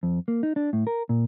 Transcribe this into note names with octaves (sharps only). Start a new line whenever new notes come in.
F2
A#3
D#4
D4
A2
A#4
A#2